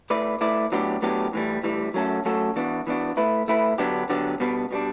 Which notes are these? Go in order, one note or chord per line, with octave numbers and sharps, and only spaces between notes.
A3 E4 B4 D5
A3 E4 B4 D5
A2 F#3 B3 D4 G4
A2 F#3 B3 D4 G4
A2 E3 G3
A2 E3 G3
F#3 A3 C#4 F#4 A4
F#3 A3 C#4 F#4 A4
E3 B3 D4 F#4
E3 B3 D4 F#4
A3 E4 B4
A3 E4 B4
D3 F#3 B3 D4 G4
D3 F#3 B3 D4 G4
B2 G3 B3 D4
B2 G3 B3 D4